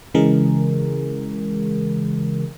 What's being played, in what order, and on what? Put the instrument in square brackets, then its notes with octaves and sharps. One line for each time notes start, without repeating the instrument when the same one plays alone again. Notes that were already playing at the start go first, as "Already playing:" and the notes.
[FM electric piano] C#3 E3 G#3 G#4 A#4